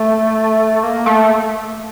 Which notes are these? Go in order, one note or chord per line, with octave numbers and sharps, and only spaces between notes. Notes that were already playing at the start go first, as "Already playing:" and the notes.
Already playing: A3
A#3
A3